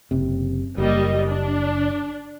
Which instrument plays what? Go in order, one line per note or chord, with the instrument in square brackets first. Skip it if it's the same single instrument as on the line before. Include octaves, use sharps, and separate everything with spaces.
[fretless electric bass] F#1 C3
[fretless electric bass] F#1 [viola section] G3 A#3 D#5
[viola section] D4